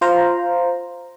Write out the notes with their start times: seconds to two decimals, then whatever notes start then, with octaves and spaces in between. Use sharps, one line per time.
0.01 F4 C5 F5 A#5